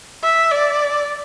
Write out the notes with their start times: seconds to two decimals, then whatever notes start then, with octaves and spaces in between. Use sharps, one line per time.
0.23 E5
0.51 D5